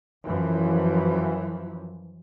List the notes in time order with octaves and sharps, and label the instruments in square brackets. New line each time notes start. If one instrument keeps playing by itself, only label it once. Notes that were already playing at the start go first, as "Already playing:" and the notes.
[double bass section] F#2 E3 F3